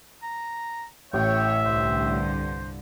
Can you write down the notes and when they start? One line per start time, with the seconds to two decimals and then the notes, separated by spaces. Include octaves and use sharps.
0.23 A#5
1.13 A1 A2 C#5 E5 G5
1.66 C2 G2 D3 C5